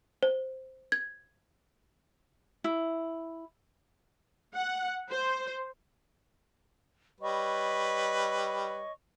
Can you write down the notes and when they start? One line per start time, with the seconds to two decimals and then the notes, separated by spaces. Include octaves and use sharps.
0.23 C5
0.92 G#6
2.64 E4
4.55 F#5
5.11 C5
7.21 G3 B4 C#5 D#5 C#6